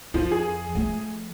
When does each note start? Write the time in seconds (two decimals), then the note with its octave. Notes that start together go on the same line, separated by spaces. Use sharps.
0.14 F2 F3
0.31 G#4
0.75 F3 A3